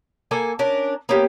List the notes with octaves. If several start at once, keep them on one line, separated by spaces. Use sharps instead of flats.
A#3 A4 G#5
C#4 D4 A#4
A#3 B3 C#4 G4